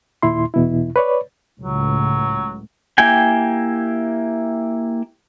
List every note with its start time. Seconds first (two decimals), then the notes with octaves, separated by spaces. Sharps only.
0.22 D#2 A#2 E4 C6
0.54 E2 B2 E4
0.96 B4 C#5 D5
1.60 C#2 A2 F#3
2.98 A#3 E4 G4 G5 G#5